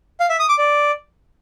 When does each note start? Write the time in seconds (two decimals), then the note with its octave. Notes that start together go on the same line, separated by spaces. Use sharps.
0.20 F5
0.30 E5
0.39 D#6
0.49 D6
0.58 D5